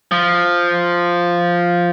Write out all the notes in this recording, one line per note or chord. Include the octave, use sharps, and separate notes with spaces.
F3